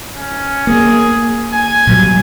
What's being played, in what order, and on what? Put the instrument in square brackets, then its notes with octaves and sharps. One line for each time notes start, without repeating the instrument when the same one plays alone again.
[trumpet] C#4
[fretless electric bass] A#3 [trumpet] G#4
[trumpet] G#5
[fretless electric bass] A#2 F#3 G3